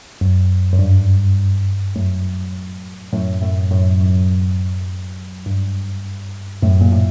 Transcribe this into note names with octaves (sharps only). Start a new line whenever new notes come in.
F#2
F#2
G2
F#2 A2
F#2 A2
F#2 A2
F#2 A2
F#2
G2
F#2 A2
A#2
A2